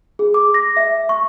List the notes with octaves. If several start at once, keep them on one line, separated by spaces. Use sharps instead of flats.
G#4
D6
A#6
E5
C#6